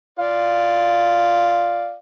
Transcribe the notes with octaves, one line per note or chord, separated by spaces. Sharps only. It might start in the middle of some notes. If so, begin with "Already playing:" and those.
F4 D5 F5